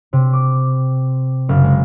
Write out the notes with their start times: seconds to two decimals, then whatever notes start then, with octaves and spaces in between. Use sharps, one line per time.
0.13 C3
0.33 D6
1.49 F#1
1.63 G#3